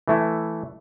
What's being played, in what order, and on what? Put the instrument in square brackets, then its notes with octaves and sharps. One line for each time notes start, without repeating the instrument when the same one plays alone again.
[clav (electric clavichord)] E3 A3 E4